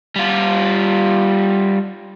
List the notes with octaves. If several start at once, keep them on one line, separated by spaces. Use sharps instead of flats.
G3 F4